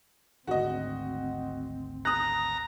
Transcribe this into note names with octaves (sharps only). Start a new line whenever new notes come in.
G#1 D2 C4 F#4 D#5
A#5 D#6 F#6